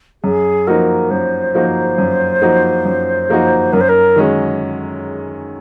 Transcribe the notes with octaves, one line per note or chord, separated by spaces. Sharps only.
F#2 G#4
F3 A#3 D#4 F#4 A#4
F#2 C5
F3 A#3 D#4 F#4
F#2
F3 A#3 D#4 F#4
F#2
F3 A#3 D#4 F#4
F#2 A#4
C5
A#4
D#3 G#3 C#4 F#4